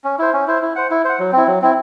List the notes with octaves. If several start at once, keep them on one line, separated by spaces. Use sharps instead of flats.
C#4
E4 C5
C#4
E4 C5
E4
C5 F#5
E4
C5 F#5
F#3
C4 E4
F#3
C4 E4